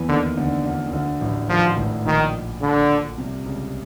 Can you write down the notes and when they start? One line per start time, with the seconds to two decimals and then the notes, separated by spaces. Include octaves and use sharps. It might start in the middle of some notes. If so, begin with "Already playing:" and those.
Already playing: E2 E3
0.08 D#2 D3 D#3
0.37 D2 D3
0.65 D2 D3
0.86 D#3
0.93 D2 D3
1.21 A1 A2
1.49 G#1 G#2 F3
1.77 A1 A2
2.06 A#1 A#2 D#3
2.62 D3
3.18 C2 C3
3.46 C#2 C#3